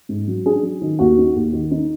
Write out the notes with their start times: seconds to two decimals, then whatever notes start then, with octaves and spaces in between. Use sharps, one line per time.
0.09 G#2
0.28 F#3
0.46 D4 G#4
0.63 F#3
0.81 D#3
0.99 D#2 F#4
1.18 D#4
1.36 D#2
1.53 D#3
1.71 D#4